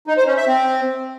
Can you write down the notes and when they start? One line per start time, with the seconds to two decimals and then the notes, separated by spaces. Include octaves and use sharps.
0.07 D#4
0.17 C5
0.27 C#4
0.37 E5
0.47 C4